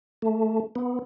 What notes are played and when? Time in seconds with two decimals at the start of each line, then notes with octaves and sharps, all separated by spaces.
0.22 A3
0.76 B3